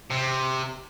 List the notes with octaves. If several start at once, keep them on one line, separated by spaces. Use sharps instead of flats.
C3